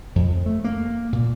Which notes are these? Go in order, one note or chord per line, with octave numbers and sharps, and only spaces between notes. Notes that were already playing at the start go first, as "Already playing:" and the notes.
F2
A3
A#3
A#2